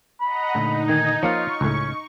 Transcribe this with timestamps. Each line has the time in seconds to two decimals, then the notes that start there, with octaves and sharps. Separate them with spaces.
0.21 D#5 F#5 A#5 B5
0.55 A#2 D3 A3 D#4
0.89 D#3 G#5
1.23 F3 A#3 F4 C#5 F5 C#6
1.61 C#2 A2 C#4